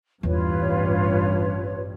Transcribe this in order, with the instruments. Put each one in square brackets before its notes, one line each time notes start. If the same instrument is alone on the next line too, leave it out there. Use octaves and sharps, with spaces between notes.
[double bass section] A1 G2 [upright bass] E2 E3 [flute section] F4 B4 C#5